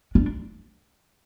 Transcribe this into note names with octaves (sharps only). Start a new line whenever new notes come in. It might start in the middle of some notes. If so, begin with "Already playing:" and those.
D4